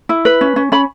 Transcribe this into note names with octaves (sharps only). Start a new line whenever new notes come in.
E4
B4
C#4
C#4
C#4 B5